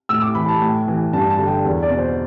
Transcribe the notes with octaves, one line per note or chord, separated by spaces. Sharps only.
A2 E6
D6
E3 B5
A5
A2
E3
G2 A5
A5
D3
G5
E2
D5
B2
C5